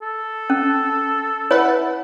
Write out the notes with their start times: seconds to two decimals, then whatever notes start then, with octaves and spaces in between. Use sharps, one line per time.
0.02 A4
0.50 C#4
1.51 E4 B4 C#5 F#5